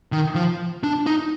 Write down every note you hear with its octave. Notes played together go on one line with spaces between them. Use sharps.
D#3
F3
D4
D#4